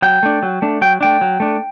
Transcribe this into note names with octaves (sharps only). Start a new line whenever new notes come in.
F#3 G5
A3 D4
F#3
A3 D4
F#3 G5
A3 D4 G5
F#3
A3 D4